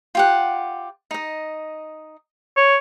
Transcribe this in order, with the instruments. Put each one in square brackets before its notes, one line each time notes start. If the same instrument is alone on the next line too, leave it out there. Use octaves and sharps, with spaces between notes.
[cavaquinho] F4 G4 F#5
D#4 D#5
[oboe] C#5